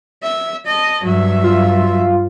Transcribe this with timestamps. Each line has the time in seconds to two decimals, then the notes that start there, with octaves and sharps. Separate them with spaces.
0.23 E5
0.66 D#5 A5
1.04 G2 F#3 E5
1.44 F4